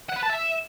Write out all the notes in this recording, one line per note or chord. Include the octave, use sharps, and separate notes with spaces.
F#5
B4
A5
E5